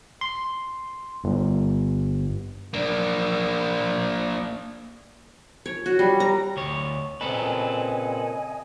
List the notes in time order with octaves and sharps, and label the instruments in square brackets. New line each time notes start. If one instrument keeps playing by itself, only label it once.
[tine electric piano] C6
G1
[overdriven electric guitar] A#3 D4
[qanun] C#5
F#4
G3
A#5
[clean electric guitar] D2 C#5
[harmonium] A#2 C#3 C4 [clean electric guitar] A4 B4 [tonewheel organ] D#5 G#5